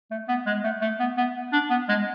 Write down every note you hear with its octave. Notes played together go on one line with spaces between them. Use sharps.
A3
B3
G#3
A3
A3
B3
B3
D4
B3
G#3